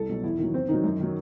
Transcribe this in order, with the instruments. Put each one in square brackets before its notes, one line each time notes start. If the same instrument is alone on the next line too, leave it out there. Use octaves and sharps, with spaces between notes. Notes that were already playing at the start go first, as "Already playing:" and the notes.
Already playing: [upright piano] C2 A4
B2 F#3
E2 E4
D#3 F#3
E2 C4
D#3 D#4
F#3
F#2
D#3 F#3